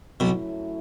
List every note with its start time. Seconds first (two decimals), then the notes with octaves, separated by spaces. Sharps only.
0.20 B1 F#2 B2 F#3 A3 E4